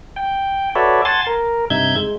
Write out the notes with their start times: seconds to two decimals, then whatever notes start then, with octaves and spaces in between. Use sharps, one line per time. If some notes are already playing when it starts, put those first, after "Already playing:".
0.16 G5
0.75 F#4 A4 B4 C#5 D5 E5
1.05 F#5 G#5 A5 C6 A6
1.27 A#4
1.70 G2 C3 D#4 E5 G6 G#6
1.96 G#3